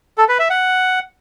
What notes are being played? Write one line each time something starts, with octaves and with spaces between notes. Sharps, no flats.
A4
B4
E5
F#5